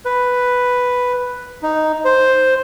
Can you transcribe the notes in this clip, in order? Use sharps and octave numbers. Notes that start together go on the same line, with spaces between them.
B4
D#4
C5